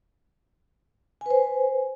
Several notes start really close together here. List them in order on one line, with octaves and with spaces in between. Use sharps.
G#5 B4 C5